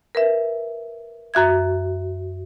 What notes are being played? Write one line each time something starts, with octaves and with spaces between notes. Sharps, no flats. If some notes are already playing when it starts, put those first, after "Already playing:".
A#4 B4 E5
F#2 F#4 E5 G#6